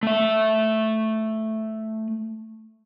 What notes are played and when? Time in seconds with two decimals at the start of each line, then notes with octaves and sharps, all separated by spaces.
0.03 A3 E5